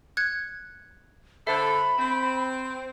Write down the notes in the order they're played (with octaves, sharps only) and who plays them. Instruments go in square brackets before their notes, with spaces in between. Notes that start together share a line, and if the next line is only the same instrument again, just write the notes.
[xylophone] F#6 G#6 C#7
[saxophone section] D3 A4 [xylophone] C5 E5 [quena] B5
[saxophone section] C4